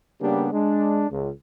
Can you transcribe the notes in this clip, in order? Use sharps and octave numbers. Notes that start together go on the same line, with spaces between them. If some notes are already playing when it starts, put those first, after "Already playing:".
C#3 G3 A#3 B3 D4 G4
G#3 D4
C#2